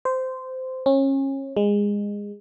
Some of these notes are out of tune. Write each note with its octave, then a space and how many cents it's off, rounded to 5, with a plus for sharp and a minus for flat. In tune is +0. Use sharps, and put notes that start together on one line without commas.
C5 -15
C#4 -30
G#3 -20